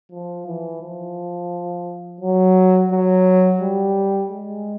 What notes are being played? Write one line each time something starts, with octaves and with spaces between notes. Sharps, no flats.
F3
E3
F3
F#3
F#3
G3
G#3